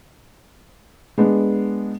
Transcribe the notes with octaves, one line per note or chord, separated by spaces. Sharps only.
G#3 B3 D4